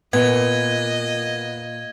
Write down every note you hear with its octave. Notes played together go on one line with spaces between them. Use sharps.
A#2 B3 D#5 G#6